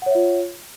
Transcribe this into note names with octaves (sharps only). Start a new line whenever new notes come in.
F4 C#5 E5 F#5